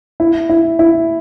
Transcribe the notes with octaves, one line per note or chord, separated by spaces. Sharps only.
E4
E4
E4